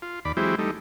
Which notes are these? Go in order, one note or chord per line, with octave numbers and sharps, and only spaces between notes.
F4
D#2 D5 B5
E3 F#3 G#3 C4 E4 G4
G3 A3 D#4